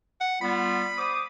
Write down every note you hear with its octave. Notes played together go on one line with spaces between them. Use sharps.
F#5
G3 B3 F4 B5
C5 D6 D#6